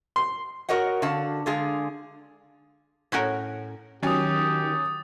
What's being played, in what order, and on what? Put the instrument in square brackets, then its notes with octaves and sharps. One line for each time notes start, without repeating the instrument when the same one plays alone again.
[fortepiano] C6
[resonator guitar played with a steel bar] F#4 A#4 C#5 D#5 F#5
D3 F#4 F5 A5
D3 G#3 F4 G#4
[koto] A2 C#4 F#4 A#4
[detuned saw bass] D#3 [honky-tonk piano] F#3 C#4 [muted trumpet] G4 [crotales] D#6 A6